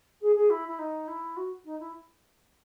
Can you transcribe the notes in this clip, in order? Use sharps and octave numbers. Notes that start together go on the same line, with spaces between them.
G#4
G#4
E4
E4
D#4
E4
F#4
D#4
E4